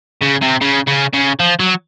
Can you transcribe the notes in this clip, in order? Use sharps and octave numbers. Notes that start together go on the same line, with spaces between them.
C#3
C3
C#3
C#3
C#3
F3
F#3